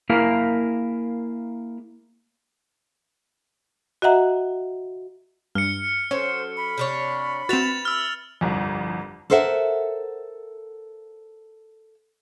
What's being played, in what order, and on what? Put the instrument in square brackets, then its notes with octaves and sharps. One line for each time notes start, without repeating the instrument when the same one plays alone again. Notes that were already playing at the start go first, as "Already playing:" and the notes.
[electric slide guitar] A#3 E4 G#4 A#4 F5
[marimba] F#4 D#5 E5 F#5 A#5
[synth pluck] G2 [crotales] F6 C#7
[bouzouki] F#3 A4 [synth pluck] C#4 [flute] C5
[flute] B5
[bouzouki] C3 D4 C#5
[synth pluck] C4 F#4 [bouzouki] B4 E5 [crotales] A6 F7
[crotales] E6 F6
[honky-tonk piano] G1 C2 F2
[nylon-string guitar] A4 A#4 C5 E5 F#5